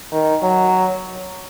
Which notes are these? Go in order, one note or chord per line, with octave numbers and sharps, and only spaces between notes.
D#3
F#3